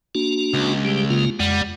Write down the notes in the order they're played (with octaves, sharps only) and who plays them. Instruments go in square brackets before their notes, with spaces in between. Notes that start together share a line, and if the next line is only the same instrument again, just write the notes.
[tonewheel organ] A#3 D4 F#4
[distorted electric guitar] C#2
[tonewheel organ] G3 G4
C#3 A#3 F4
[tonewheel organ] F2 G#3 F#5 [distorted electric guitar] G3